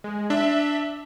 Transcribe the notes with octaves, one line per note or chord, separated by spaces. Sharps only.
G#3
D4 E5